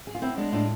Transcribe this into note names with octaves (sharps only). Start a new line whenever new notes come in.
G#4
F4
B3 C4 E4
G#3 D4
A2 D4 F4